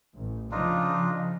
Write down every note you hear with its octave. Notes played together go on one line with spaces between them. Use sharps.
A1
C#3 F3 D4 D#4 F4